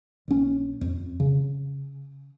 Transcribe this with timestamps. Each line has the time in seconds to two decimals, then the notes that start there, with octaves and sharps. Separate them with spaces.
0.28 A#1 C#4
0.81 F2
1.20 C#3